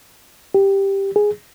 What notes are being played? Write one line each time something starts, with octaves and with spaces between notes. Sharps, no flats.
G4
G#4